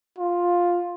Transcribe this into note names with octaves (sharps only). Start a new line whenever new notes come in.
F4